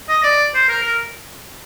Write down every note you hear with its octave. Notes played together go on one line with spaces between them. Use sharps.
D#5
D5
C5
A#4
A#4